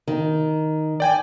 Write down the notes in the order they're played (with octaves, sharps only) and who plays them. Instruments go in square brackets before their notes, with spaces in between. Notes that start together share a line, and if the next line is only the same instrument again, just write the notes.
[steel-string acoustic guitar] D#3
[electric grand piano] D5 G5 G#5